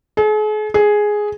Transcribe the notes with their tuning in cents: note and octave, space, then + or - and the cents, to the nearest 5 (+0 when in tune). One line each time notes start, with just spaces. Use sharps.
G#4 +45
G#4 +5